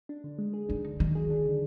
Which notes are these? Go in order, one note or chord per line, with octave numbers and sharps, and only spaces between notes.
D4
D3
G#3
G#4
D4 D#4
D3
D#3 F#3
G#4
D4
D3